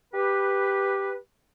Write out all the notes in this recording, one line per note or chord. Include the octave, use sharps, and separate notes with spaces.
G4 B4